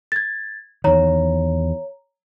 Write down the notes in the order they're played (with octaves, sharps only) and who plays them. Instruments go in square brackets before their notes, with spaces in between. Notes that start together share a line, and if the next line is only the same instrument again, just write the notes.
[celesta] G#6 A6
[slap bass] E2 D#3 [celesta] C#5 A#5